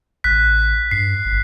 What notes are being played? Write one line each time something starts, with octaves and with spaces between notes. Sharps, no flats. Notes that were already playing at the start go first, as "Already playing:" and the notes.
A1 F#6 B6
G2 C7
G#1